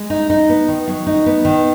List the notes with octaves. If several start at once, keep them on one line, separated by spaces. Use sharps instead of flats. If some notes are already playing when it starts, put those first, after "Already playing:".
Already playing: G#3
D#4
D#4
B3
D#3
F#3
D#4
B3
D#3